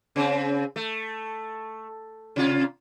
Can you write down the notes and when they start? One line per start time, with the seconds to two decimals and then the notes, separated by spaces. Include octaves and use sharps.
0.16 C#3 C4
0.76 A3
2.36 C3 F4